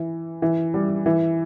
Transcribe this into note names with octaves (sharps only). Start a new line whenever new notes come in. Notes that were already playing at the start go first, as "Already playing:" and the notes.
Already playing: E3
E3
G3
E3